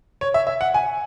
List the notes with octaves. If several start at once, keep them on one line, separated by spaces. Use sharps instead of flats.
C#5
E5
E5
F#5
G#5